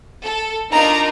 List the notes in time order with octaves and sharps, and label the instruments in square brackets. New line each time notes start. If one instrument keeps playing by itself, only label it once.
[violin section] A4
[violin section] D4 F4 A#4 [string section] D#4 [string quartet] A#5